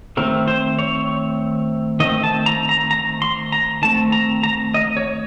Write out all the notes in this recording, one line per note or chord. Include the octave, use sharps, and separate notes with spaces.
D#3 A3 C4 A#4
C5
C#5
D#3 A3 C4 D#5
A5
A#5
A#5
A#5
C6
A#5
D#3 A3 C4 A5
A#5
A#5
D#5
C#5